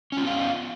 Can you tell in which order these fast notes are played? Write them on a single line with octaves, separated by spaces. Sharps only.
C#4 F4 B3 F5